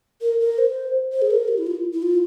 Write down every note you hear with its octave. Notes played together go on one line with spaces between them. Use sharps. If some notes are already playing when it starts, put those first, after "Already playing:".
A#4
A#4
C5
C5
G#4
A#4
G4
E4
F4
E4
F4